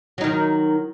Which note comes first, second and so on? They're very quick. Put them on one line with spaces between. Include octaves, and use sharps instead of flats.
F#3 D#4 D#3